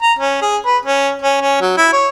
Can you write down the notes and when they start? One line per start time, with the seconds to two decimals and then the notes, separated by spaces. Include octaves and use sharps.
0.02 A#5
0.19 C#4
0.41 G#4
0.65 B4
0.85 C#4
1.22 C#4
1.41 C#4
1.61 F#3
1.77 E4
1.92 C#5